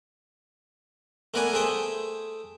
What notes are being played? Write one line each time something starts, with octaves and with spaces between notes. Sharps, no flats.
A3 B3 A#4 B4 D5 G#5
A3 G#4 C5 E5 G5